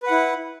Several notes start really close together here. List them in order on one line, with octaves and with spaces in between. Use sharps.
B4 F#5 E4